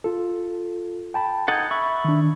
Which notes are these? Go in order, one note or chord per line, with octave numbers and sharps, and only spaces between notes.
F4 A4
G5 A5 B5
D#4 A4 F#5 G#6 A6
E5 B5 C#6
D#3 D4